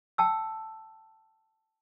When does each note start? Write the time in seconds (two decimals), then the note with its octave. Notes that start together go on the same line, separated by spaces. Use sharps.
0.18 G5 A5 E6